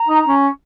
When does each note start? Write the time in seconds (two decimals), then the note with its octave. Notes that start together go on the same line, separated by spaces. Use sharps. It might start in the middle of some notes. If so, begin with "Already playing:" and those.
Already playing: A#5
0.08 D#4
0.28 C#4